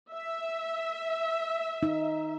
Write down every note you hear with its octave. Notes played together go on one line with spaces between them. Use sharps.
E5
D#4